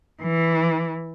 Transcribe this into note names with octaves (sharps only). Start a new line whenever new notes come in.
E3